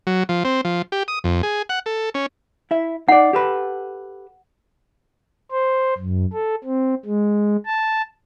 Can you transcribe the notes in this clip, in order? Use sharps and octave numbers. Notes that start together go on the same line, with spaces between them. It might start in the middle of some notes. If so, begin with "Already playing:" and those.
F#3
F3
C4
F3
G4
D#6
F2
G#4
F#5
A4
C#4
E4 E5
D#4 D5 F#5
G4 A4 B4
C5
F#2
A4
C4
G#3
A5